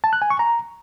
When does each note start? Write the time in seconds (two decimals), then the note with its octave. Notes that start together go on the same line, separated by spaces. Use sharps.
0.04 A5
0.13 F#6
0.22 G#5
0.30 C#6
0.39 A#5